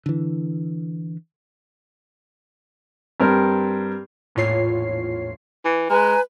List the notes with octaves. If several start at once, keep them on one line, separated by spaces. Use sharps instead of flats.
D3 E3
G2 C4 A#4
A#1 E2 A2 F4 C#5 C7
E3
G#3 B4 G#5 A#5